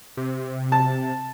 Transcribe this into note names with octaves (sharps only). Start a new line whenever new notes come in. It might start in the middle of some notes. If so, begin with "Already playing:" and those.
C3
A5